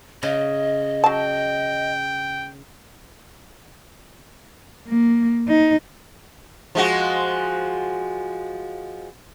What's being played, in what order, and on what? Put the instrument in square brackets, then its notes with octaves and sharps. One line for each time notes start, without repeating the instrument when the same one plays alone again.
[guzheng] C#3 [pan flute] D#5
[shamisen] F#3 A5 [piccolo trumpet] G5
[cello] A#3
D#4
[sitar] F3 G#3 F#4